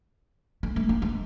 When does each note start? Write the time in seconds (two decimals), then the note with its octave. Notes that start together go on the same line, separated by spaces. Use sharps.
0.63 A3
0.76 A3
0.89 A#3
1.02 G#3